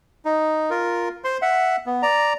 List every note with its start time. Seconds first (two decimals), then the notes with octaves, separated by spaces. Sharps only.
0.25 D#4
0.70 F4 A#4
1.24 C5 C6
1.42 E5 F#5
1.86 B3
2.03 D5 A#5